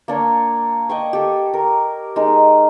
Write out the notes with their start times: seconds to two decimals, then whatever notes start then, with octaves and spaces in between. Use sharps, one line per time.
0.08 A#3 D4 C#5
0.89 D#5 G5 C#6
1.13 G4 A4
1.54 A#4
2.16 G#3 D#4 A#4